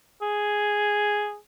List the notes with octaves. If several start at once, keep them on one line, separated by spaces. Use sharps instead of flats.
G#4